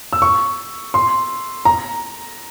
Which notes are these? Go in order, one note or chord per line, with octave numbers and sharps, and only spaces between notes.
E6
C#6
C6
A#5